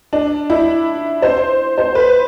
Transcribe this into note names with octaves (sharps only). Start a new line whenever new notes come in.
D4
E4
C5
C5
B4